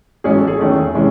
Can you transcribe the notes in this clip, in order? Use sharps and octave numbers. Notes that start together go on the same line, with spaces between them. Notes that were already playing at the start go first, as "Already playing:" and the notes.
A1 G#2 F#3 C#4 G#4
A4
G#4
E2 D#3 A3 C#4
C3 E3 G#3 C#4